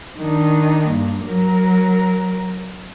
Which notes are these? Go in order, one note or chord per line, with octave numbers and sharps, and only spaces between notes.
D#3 D4
G2 A#3
F#3 A#4